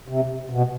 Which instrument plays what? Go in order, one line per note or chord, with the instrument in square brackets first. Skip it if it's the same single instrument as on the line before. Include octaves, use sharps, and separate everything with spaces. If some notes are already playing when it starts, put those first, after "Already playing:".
[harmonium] C3
B2